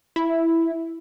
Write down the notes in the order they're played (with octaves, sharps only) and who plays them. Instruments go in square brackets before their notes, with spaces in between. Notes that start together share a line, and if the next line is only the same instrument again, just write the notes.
[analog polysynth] E4